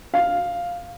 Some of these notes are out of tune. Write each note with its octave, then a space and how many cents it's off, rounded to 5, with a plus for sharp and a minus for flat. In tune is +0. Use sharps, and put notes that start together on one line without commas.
F5 +0